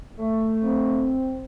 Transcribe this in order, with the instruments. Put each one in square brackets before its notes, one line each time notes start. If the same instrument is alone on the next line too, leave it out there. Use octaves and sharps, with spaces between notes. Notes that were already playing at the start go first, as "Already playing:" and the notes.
[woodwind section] A3
[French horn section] C4